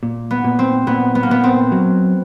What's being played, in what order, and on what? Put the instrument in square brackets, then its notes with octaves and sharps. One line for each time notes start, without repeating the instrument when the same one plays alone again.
[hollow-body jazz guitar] A#2
[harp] B3
[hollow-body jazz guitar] A#2
[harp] C4
[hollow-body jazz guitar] A#2 [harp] B3
[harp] B3
A#3
[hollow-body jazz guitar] A#2 [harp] B3
[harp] C4
[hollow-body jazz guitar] F#3